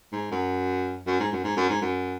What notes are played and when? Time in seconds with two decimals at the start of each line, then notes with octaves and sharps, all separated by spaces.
0.12 G#2
0.31 F#2
1.06 F#2
1.20 G#2
1.32 F#2
1.44 G#2
1.56 F#2
1.69 G#2
1.81 F#2